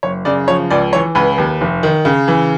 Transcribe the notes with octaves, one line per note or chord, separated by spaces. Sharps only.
F#1 C#5
C#3 D5
F3 C#5
C#2 D5
E3 C#5
C#2 B4
D#2
F1
D#3
C#3
E3